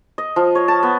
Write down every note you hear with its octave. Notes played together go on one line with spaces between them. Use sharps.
D#5
F3
C#5
A5
B3